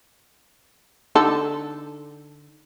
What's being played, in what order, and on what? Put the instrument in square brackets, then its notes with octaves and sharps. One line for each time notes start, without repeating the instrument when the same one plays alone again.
[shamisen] D3 D#4 A4